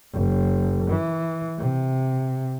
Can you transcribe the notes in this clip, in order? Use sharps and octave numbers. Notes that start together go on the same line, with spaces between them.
F#1
E3
C3